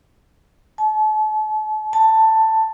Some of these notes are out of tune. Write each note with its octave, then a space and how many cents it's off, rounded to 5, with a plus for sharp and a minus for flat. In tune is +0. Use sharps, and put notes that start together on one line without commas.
A5 -40
A5 +10